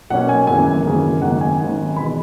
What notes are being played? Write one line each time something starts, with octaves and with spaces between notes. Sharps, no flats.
B1 B2 A#3 C#4 F#5
G#5
G#1 F#2 C#3 E3 A#3 G#5
G#1 F#2 C#3 E3 A#3
G#1 F#2 D#3 A#3 F#5
G#5
G#1 F#2 D#3 A#3
E1 E2 B2 B5